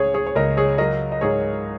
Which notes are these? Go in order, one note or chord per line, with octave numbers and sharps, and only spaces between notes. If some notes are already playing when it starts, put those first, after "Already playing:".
Already playing: C#2 C#3 G#4 C#5
G#4 C#5
C#5
C#2 A#4 D#5
G#4 C#5
F#3 A#4 D#5
D#5
G#2 G#4 C#5